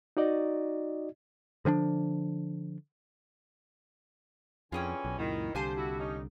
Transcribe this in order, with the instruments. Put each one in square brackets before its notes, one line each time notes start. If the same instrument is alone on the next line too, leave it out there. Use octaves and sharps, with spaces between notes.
[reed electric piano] D#4 F#4 D5 D#5
[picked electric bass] D3 F3 C#4 D4
[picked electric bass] F2 [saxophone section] D3 E3 C#4 [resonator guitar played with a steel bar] F4 G#4 G5 [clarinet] G#5
[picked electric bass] B1
[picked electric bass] C#2 F#2 A#2 [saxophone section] D#3 [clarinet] E4
[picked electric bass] C2 D3 [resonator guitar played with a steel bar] A#3 G#5 A5 [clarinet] G4 [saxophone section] C5
[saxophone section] E4 F#4
C#4 D#4